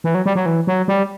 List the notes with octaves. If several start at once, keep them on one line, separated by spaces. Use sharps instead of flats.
E3
F#3
G3
F#3
E3
F#3
G3